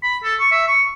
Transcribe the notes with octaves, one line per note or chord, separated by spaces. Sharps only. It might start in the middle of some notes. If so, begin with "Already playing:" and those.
B5
A4
C#6
E5
C#6